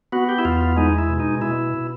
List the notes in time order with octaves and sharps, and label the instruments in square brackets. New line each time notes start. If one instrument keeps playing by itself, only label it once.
[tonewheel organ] B3 F#4
G4
E4
E2 F4
F4
G#3 D#4
E4
B2
D#4
B2 E4
B2